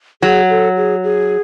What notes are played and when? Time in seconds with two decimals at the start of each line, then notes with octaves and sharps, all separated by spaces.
0.22 F#3 G#4
0.50 A4
0.76 G#4
1.04 G#4